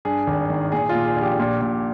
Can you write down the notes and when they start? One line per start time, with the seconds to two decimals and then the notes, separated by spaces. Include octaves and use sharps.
0.05 G2 G#4
0.27 G#1
0.50 D#3
0.72 A#2 G#4
0.89 F4
0.95 A#2
1.05 G#4
1.16 A#1
1.22 G4
1.39 A#2
1.61 A#2